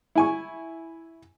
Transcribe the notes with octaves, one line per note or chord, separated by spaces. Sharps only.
E4 G#5 C#6